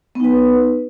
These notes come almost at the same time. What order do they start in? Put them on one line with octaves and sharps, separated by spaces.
B3 D#4 B4